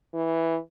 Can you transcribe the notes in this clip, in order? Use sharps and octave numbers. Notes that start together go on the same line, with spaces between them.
E3